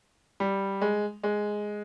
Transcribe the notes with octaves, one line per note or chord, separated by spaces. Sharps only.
G3
G#3
G#3